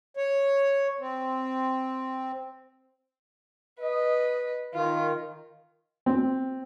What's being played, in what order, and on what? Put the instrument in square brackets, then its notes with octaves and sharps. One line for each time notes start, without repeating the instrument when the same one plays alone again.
[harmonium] C#5
C4
[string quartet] B4 [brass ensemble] D#5
[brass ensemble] D#3 [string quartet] F4
[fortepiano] C4